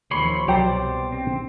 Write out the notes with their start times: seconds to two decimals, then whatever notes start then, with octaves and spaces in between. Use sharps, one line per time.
0.11 D#2 C3 F3 C#5 B5 C6
0.48 C2 B2 F#3 G4 C5 D5 G5 A#5
1.12 C4